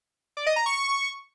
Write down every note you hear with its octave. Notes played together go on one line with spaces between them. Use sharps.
D5
D#5
A#5
C#6